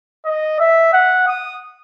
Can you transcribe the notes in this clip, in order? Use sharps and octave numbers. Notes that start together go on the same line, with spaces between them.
D#5
E5
F#5
D#6